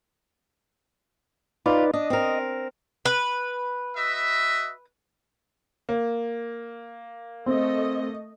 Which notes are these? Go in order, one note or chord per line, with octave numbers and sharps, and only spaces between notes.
D#4 F4 B4 D5
D4 D#5
C4 A#4
B4
F#4 D#5 E5
A#3
A3 C4 D#5